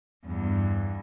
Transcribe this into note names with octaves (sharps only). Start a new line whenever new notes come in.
E2 G2